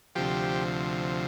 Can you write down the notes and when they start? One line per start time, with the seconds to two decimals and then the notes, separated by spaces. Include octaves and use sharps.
0.16 D2 C3 F3 G4